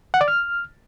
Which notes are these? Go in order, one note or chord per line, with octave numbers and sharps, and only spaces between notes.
F#5
D5
F6